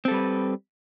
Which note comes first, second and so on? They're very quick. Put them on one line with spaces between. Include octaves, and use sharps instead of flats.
C4 A4 G3 B4